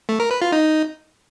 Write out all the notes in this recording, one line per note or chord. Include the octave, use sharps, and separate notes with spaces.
A3
A#4
B4
F4
D#4